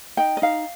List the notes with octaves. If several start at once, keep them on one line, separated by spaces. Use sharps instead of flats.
D#4 G5
D#5
D#4 F5